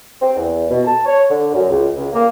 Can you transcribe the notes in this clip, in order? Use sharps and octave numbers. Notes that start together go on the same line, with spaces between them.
C4
E2
B2
A5
C#5
D3
F#2
C#2
C#2
A#3